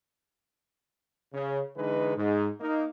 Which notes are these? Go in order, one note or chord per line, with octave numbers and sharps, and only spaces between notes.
C#3
D3 E3 G#3 D#4 B4
G#2
A#3 D#4